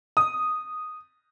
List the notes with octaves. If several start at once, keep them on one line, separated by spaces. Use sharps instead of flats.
D#6